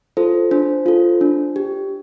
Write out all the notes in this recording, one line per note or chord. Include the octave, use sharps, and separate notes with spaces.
F4 A4 C5
D4 C5
F4 A4
D4
G4